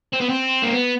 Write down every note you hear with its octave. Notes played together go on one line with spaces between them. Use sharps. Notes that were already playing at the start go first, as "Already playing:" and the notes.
C4
B3
C4
A#3
B3